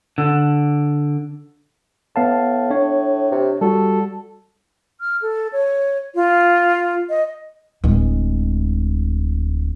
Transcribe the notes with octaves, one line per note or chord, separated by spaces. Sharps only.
D3
A2 B3 F5 A5
D4 C#5
C3
G3 F#4 A4
F6
A4
C#5
F4
D#5
D1 G#3